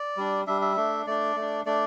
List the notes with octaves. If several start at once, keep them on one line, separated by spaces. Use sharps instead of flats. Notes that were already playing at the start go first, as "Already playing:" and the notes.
Already playing: D5
G3 D4
G3 D4 E5
E5
A3 D4
A3 D4 D5
A3
D4
A3 D4 D5